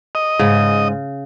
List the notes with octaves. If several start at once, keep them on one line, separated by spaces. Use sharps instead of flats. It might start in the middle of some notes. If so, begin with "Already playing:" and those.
D#5
G#2 C#3